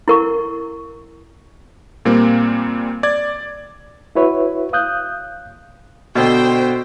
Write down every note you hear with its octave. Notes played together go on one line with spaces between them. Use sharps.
E4 A#4 C#6
A#2 G3 A#3 C4
D5 G#6
E4 F#4 B4 C#5 E5
F5 D#6 F#6 G6
B2 D3 F#4 C5 D#5 G5 E6